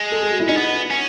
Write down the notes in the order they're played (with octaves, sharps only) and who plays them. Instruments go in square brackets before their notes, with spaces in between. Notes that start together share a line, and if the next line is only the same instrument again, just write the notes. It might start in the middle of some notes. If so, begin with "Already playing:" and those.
Already playing: [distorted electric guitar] G#3
[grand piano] A4
G#4
F#4
E4
[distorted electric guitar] C#4 [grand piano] D#4
[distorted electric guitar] B3
C#4